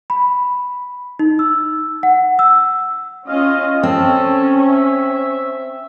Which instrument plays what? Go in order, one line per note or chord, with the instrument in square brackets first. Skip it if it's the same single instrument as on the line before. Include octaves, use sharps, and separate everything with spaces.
[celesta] B5
D#4
E6
F#5
E6
[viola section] C#4 F4 D#5 [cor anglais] F5
[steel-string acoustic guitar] C4 [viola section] C#4 [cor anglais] A4
[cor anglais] E5